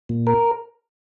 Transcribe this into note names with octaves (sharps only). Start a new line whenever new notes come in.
A#2
A#4